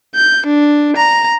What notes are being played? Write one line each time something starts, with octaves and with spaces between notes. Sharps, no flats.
G6
D4
A#5